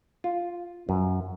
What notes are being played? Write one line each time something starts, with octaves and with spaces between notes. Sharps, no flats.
F4
F#2